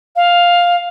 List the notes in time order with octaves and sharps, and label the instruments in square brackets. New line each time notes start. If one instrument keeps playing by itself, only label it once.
[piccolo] F5